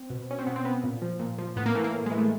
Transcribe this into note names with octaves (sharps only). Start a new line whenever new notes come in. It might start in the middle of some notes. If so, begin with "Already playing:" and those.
Already playing: C4
B2
C#4
C4
B2 B3
C4
B3
A#2
F3
A#2
F3
A2 B3
A#3
E3 A3
A#3
A2
G#3
E3
A3